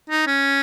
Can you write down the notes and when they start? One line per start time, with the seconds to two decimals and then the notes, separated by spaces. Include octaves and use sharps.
0.10 D#4
0.27 C#4